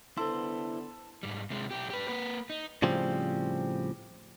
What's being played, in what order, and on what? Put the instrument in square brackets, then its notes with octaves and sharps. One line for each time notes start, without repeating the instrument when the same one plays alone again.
[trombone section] D3 B3 [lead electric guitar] E4 C5 [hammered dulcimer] A4 [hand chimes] C6
[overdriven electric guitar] G#2 G3
C3 G#3
B1 G4
G4 B4
A#3 B4
D#4
[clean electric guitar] A2 C#3 F3 G3 C4